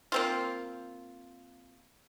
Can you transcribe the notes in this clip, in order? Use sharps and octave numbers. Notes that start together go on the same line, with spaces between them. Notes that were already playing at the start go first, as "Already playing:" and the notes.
A#3 C4 F4